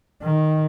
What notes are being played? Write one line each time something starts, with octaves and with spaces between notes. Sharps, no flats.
D#3